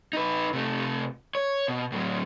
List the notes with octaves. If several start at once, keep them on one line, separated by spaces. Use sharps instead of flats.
D#4 B4
C3 A3
C#5
B2
A2 F#3